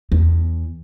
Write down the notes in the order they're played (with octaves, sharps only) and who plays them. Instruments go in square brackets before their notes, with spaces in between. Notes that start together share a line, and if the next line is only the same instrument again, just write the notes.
[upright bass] E2